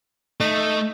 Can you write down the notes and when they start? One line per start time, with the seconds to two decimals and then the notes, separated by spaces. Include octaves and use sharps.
0.40 A3 D#4